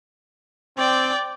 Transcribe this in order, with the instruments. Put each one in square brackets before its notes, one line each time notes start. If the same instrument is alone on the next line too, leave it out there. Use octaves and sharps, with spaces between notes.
[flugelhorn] C4 [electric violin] D5 G5